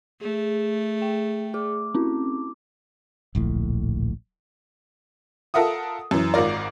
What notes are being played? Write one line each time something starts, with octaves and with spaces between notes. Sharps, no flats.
A3 G#4
G5
G#4 D6
C4 C#4 E4
D1 A#1 A2
F4 A4 A#4 E5 F#5 D#6
F#2 E3
G#1 G#2 F4 A#4 D5